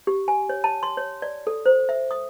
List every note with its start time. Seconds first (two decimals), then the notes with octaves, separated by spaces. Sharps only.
0.07 G4
0.28 G#5
0.49 C#5
0.64 A5
0.83 C6
0.97 C#5
1.22 D5
1.47 A4
1.66 C5
1.89 E5
2.11 D#6